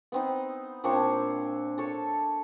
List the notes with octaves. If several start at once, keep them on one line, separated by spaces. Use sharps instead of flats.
B3 C4 D#4
A#2 C4 D4 C#5
A4 C#5 A5